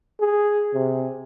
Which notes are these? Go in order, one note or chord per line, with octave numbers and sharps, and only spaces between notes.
G#4
C3